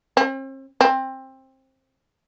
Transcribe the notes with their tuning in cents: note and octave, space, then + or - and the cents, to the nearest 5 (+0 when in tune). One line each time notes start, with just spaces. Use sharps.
C4 +45
C4 +20